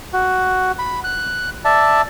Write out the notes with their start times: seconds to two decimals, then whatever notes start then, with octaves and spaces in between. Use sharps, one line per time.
0.13 F#4
0.79 B5
1.04 F#6
1.65 D5 E5 A5